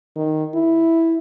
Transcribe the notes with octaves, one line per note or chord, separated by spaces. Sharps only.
D#3
E4